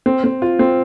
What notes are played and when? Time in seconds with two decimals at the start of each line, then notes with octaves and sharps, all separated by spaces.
0.06 C4
0.24 C4
0.42 F4
0.59 C4